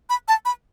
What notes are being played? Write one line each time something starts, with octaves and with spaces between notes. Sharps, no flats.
B5
A5
B5